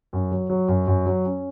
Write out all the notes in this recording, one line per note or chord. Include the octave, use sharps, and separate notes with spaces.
F#2
F#3
F#3
F#2
F#2
F#3
C#4